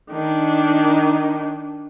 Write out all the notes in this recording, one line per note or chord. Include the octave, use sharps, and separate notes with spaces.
D#3 D4